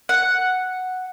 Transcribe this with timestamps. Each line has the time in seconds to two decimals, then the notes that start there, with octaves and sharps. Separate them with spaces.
0.09 F#5